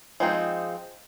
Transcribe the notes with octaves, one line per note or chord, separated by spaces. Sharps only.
F3 G#3 C4 D#4